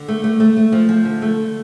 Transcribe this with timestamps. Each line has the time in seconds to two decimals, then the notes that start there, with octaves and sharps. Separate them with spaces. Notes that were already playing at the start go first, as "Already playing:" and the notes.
Already playing: D3
0.08 A3
0.24 A3
0.40 A3
0.57 A3
0.72 F3
0.89 F3
1.05 D3
1.22 A3